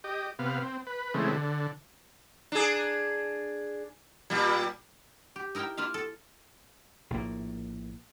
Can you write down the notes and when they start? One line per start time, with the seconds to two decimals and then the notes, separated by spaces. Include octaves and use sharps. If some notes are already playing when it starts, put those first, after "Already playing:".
0.04 G4 D#5
0.39 C3 B3 F5
0.62 C4
0.87 B4
1.14 C#3 E3 G#3 A3 C4
1.32 D3
2.52 D4 G#4
4.30 A#2 G3
5.36 G4
5.55 D#4 E4 A#4 E5 G5
5.77 A#3 E4 F4 E5 F5
5.94 A4
7.10 A#1 A2 A#3